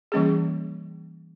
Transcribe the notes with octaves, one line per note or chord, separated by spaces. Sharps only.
E3 G3 A#3 C#4 G#4